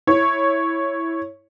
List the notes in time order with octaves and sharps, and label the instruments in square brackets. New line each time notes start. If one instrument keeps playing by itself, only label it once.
[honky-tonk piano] E4 C#5